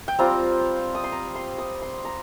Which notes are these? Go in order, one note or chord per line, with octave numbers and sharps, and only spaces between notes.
G5
G3 C4 F4 A#5
D#6
C6
A#5
C6
D#6
C6
A#5